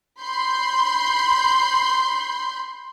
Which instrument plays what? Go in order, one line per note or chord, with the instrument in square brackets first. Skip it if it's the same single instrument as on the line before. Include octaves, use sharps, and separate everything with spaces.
[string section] B5 C6 G6